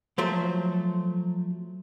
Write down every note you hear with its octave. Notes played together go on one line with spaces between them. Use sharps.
F3 F#3 A3 C5